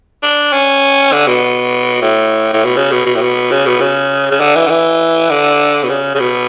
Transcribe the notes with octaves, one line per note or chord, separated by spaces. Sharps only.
D4
C#4
D3
B2
A2
A2
B2
C#3
B2
B2
A2
B2
C#3
B2
C#3
C#3
D3
E3
D3
E3
D3
B2
C#3
C#3
B2